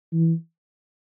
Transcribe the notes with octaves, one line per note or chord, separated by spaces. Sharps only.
E3